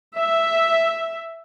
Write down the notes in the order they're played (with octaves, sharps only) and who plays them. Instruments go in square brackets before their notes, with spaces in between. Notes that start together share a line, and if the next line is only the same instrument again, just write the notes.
[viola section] E5